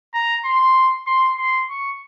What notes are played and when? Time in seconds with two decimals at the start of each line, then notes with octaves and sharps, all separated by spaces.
0.14 A#5
0.45 C6
1.06 C6
1.38 C6
1.69 C#6